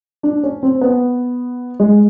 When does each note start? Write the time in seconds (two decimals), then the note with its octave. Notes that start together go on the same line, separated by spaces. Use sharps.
0.23 D4
0.44 C#4
0.63 C4
0.81 B3
1.80 G#3